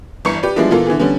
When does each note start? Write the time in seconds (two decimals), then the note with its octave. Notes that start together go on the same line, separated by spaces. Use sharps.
0.25 G1 E3 C#6 C#7
0.43 G4 B4 D5
0.56 F3 G3 G#3 B3 D4 E4
0.71 A#2 E3 B3 F4 A4
0.87 D3 E3 B3 G#4
0.99 D3 G3 B3 C#4